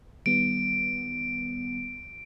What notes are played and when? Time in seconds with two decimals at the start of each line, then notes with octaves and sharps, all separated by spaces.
0.26 D#3 G3 B3 D7